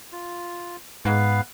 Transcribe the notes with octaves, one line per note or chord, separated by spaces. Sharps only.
F4
G#2 B3 B4 F5